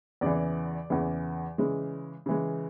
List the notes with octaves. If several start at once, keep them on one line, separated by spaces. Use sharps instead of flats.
E2 C#3 E3 D5
E2 C#3 E3
C#3 E3 G#3
C#3 E3 G#3